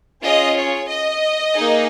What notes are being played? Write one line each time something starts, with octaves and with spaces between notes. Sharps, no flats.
C#4 F4 G#4 D#5
C#5
D#5
A#3 D#4 G#4